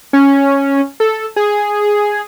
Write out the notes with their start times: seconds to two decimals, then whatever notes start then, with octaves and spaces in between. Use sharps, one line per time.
0.13 C#4
1.00 A4
1.36 G#4